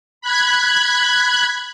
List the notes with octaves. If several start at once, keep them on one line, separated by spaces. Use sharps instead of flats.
B5 F#6 G#6